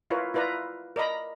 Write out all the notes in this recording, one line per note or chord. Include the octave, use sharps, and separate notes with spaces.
E4 F4 A#4 B4 C#5
E4 F4 B4 D5 A#5
A#4 D5 D#5 A#5 B5